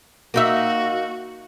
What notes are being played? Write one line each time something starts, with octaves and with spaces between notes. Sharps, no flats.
A#3 D#4 F#4 E5